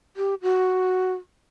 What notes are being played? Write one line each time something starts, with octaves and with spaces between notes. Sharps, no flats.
G4
F#4